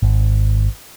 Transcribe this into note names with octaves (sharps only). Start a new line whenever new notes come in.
G#1